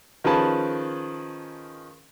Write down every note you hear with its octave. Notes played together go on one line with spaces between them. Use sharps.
D#3 F3 C#4 G#4 B4 A5